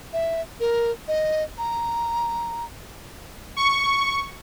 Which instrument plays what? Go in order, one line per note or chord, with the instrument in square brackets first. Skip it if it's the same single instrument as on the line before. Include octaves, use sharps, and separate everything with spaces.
[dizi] E5
A#4
D#5
A#5
[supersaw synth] C#6